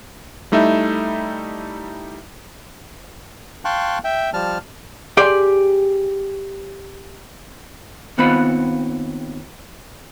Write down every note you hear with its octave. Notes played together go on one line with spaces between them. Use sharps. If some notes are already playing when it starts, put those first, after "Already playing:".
G3 A3 D#4 E4 E5
F5 G5 A5 C6 C#6 F#6
E5 G5
F3 G3 A5 F6
G4 G#4 D5 C6
D#2 D#3 B3 C4 F4 B5